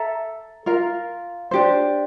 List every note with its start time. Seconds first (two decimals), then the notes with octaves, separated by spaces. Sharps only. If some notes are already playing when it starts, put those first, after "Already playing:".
Already playing: A4 E5 A#5
0.66 F4 A#4 F5
1.51 D4 G4 C5